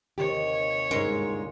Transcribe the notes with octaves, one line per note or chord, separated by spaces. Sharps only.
D#2 C3 D#3 G4 C#5
G1 G#2 G#3 A#3 C#4 D#4 A#4 C6